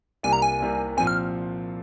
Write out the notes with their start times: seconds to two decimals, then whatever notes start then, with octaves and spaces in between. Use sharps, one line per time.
0.23 C2 C3 G3 A#3 G#5
0.33 A#5
0.42 G#5
0.60 C2 C3 G3 A#3
0.97 A#2 F3 C4 G#5
1.07 F6